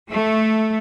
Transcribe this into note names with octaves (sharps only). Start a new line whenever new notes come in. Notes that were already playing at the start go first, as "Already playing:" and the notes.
A3